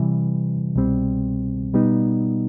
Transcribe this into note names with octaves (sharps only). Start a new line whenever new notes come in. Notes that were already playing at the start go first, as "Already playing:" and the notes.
Already playing: C3 E3 G3
C2 B2 G3 C4
B2 G3 B3 D#4